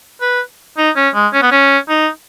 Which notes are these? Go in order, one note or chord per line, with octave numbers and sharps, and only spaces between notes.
B4
D#4
C#4
G#3
C#4
B3
C#4
D#4